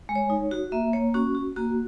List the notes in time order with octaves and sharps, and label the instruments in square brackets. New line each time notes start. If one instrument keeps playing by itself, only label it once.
[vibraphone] G#3
C#5
D#4
F#4
A#3 E5
A#3 C#5
C#4 F#4
F#4
A#3 F#4